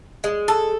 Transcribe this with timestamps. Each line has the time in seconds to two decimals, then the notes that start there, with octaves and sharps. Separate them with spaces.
0.24 G#3
0.48 A4